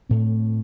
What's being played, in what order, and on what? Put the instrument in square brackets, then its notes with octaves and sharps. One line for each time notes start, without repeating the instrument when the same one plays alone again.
[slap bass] A2 A3 C4